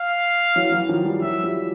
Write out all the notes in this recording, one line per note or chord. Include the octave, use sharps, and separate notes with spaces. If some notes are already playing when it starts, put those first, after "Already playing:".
Already playing: F5
E3 F#3
E3 F#3
D#3 F3
F3 G3
E3 F#3 E5
F3 G3